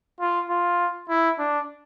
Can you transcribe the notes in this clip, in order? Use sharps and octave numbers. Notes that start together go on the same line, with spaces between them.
F4
F4
E4
D4